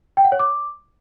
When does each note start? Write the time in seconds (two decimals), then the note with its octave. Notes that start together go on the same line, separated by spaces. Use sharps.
0.17 G5
0.25 F#5
0.32 C#5
0.39 D6